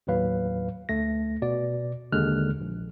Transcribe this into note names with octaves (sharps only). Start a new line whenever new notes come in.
D#2 A2 F#3 B4 F5
D2 A3 A#6
B2 D5
D#2 D3 G#3 F6 F#6
A#1